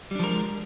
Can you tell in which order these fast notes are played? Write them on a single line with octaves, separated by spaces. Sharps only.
G3 D4 F3 A#4 G#3